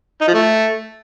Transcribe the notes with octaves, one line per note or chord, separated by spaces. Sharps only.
D#4
F3
A3